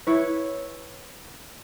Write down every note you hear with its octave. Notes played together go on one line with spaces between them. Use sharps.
E4 B4 C#5